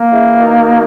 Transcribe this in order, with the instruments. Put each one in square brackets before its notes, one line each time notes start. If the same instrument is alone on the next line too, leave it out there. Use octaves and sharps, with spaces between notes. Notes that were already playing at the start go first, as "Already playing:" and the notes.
Already playing: [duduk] A#3
[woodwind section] C#3 E3
B2 D#3